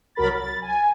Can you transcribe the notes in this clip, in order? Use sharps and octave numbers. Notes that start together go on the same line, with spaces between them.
C2 F#3 A#4 B5 A6
A6
G#5